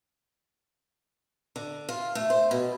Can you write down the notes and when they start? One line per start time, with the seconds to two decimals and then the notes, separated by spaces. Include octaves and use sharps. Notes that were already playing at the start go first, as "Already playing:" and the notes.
1.56 D3
1.89 F4
2.15 A3
2.30 C5
2.51 B2